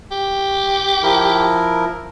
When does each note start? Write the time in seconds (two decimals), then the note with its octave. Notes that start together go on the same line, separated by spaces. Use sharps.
0.11 G4
1.03 F3 E4 A#4